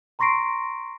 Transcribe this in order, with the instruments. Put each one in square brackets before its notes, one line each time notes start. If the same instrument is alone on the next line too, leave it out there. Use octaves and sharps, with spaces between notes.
[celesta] A#5 C6 C#6 A#6 C7 D7